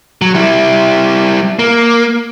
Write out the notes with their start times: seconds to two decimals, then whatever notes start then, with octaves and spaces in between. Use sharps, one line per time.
0.22 F#3
0.35 G3 E4
1.59 A#3